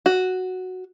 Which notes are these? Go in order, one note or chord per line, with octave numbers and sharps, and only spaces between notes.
F#4